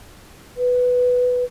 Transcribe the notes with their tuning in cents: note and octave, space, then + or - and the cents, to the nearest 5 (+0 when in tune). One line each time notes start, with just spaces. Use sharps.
B4 +5